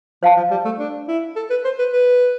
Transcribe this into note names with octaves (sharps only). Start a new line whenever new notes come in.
F3 C5 F5 A5
F3
G3
A3
D4
E4
A4
B4
C5
B4
B4